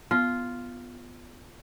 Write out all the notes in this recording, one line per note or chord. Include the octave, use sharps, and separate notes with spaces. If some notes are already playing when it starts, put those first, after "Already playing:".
B3 F4 F6